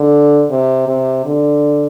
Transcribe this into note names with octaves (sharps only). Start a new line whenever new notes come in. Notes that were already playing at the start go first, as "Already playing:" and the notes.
Already playing: D3
C3
C3
D3